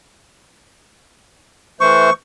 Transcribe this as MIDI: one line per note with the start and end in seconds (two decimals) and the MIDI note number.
1.81 2.10 52
1.81 2.10 57
1.81 2.10 72
1.81 2.13 85